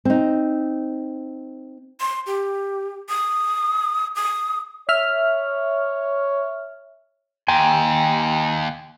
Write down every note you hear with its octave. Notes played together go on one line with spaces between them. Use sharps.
C4 D#4
C6
G4
D#6
D#6
C#5 E5 F6
D#2 G5 G#5 C6